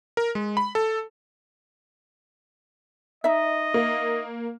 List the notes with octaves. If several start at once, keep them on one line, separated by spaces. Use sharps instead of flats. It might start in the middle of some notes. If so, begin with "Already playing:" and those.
A#4
G#3
B5
A4
D#4 D#5 E5
A#3